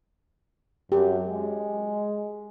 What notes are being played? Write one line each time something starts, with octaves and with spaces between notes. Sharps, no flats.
F#2 G4
G#3